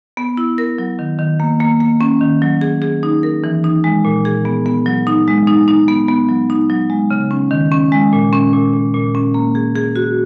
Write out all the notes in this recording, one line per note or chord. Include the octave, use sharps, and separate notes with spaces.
B3
E4
A#4
F#3
D#3
D#3
A#3
A#3
A#3
C#4
D#3
F#3
G#4
G#4
D#4
A#4
E3
D#4
G#3
A#2
G#4
B3
B3
F#3
D#4
G#3
D#4
D#4
B3
B3
F#3
D#4
F#3
G#3
C#3
C#4
D#3
C#4
G#3
A#2
C#4
A#2
A#2
A#2
C#4
A#3
G#4
G#4
F#4